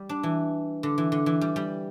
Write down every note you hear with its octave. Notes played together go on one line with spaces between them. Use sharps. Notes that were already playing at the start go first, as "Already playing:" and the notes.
Already playing: G3
D4
E3
D3
E3
D3
E3
G3
G3